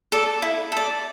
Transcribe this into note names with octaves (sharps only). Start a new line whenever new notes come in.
A4 D5
E4
A4 D5